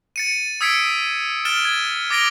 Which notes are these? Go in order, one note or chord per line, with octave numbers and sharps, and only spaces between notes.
A6 C#7 D#7
D#6 E6 G#6 B6 C#7 D7
F6 A6 D7 E7 G7
G#6
D6 A6 A#6 D7 F7 G7